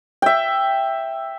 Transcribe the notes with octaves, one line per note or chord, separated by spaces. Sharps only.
E5 G5